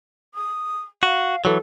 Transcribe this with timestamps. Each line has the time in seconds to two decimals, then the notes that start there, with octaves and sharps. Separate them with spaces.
0.34 D#6
1.03 F#4 F5
1.45 E3 F#3 A4